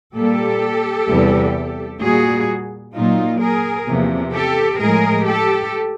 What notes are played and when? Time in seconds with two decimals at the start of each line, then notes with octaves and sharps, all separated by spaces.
0.15 A#2 G3 A#3 G4 A4
1.09 E2 C3 E3 G3
2.01 A#2 G3 A#3 F#4 G#4
2.94 A#2 F#3 A#3 D#4 F4
3.40 G#4 A#4
3.87 E2 C3 F3 A#3
4.33 G4 A4
4.80 A2 F3 G#3 G#4 A#4
5.26 G4 A4